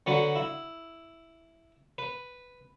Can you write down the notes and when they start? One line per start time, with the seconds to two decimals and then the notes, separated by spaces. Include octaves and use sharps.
0.07 D3 F#3 F#4 B4
0.36 E4
1.98 B4